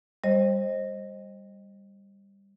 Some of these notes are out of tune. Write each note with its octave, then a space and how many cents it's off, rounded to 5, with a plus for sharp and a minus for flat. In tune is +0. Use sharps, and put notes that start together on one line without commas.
G3 +15 C5 +25 D#5 +0